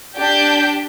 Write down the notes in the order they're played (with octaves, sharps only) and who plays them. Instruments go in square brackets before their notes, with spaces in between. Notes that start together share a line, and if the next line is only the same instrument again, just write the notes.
[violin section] D4 G4 G6